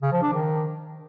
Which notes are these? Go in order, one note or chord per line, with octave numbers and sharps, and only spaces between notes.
C#3
F3
D4
D#3